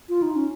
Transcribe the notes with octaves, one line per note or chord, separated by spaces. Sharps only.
F4
D#4
C#4